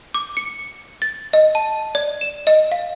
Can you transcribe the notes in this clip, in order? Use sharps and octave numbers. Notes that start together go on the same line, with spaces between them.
D6
C#7
A6
D#5
A5
D5
E7
D#5
F5